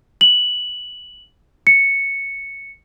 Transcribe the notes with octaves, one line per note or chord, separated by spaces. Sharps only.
F#7
C#7